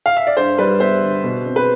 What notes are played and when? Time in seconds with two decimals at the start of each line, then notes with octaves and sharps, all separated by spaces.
0.06 F5
0.17 E5
0.27 D5
0.37 G2 C5
0.58 G3 B4 D5
0.80 B3 C5 E5
1.03 D3
1.24 B2
1.46 C4
1.56 B4